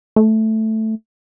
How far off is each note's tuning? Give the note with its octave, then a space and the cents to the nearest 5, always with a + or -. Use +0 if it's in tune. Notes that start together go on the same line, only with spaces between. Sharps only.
A3 +0